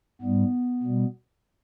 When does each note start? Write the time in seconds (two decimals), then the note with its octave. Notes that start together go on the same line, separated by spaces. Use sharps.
0.22 G#2 G3 B3
0.83 B2 G3